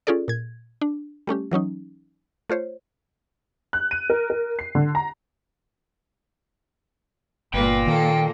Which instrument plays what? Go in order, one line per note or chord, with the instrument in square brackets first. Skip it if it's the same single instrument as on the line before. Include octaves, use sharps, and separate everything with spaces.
[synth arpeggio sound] C#4 F4 G#4 A4 D5
A#2 G#6
D4
G3 A3 C#4 G4
E3 F#3 C#4 D#4
A3 F4 C5 C#5
[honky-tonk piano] F#6
D#7
A#4
A#4
C7
D3
A#5
[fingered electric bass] G1 [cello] A#2 A#3 [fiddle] B4 [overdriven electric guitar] G5
[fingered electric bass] D#3 [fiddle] A4